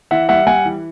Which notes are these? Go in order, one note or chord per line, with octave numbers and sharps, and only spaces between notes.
E3 E5 F#5
G3 E5 F#5
G3 F#5 G#5
E3